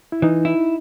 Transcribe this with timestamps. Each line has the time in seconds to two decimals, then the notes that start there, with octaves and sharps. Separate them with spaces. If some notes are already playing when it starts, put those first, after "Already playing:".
0.12 E4
0.22 E3 D#4
0.45 E4